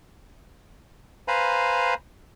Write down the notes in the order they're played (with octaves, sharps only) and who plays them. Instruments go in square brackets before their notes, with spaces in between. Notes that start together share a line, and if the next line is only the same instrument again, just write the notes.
[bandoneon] B4 C5 F5 G#5 A#5 B5